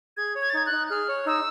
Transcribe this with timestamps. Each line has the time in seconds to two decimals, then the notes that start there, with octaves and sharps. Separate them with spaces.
0.17 G#4 G#6
0.35 C#5
0.41 G#6
0.50 A6
0.54 D#4 G#6
0.66 F#6
0.72 D#4
0.90 G#4 F6
1.08 C#5
1.26 D#4 E6